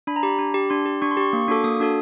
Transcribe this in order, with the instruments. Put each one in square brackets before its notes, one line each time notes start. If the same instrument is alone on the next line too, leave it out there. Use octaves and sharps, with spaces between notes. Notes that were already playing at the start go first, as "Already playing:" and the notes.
[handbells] D4 B5
A#5
G4 B5
D4
G4
D4 C6
G4
D4 C#6
C6
G4 C#6
A#3
C#6
D4 F#4 A4 D6
A#3 D#6
D4 F#4 A4